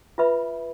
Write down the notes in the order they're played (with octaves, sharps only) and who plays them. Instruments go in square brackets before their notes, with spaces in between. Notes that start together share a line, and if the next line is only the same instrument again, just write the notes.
[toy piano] F4 B4 E5 B5